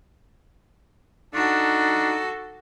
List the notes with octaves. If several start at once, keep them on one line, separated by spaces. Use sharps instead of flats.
D4 D#4 F#4 A4